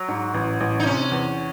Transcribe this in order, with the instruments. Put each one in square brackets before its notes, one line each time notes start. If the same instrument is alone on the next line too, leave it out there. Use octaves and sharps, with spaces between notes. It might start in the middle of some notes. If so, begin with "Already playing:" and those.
Already playing: [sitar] F#3
[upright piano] G#2
A1
A1
[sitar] D#4
[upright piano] C3 [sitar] C#4
[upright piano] E2